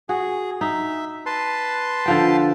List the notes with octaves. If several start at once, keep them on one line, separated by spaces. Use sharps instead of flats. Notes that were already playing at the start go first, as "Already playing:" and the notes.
F#4 G#4
D#4 E5
B4 A5 C6
D3 F3 G5